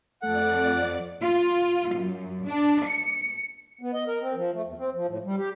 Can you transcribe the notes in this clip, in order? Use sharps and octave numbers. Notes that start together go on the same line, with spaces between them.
F2 A3 A4 D5 F#5
F4
F#2
D4
C#7
B3
D#5
A#4
C4
F3
A3
E2
C4
F3
A2
G3
G4